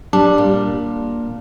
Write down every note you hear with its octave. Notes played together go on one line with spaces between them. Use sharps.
G3 D4
A#2